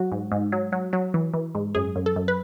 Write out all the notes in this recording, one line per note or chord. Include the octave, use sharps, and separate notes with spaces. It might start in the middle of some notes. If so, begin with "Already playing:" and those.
Already playing: F#3 F#4
G#2
G#2
F#3
F#3
F#3
E3
E3
G#2
F#2 G#4
F#2
A4
F#2
B4